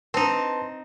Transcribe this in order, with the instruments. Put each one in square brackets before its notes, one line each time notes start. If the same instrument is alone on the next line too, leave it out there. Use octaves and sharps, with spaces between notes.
[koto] C4 D#4 [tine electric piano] B4 A5 C6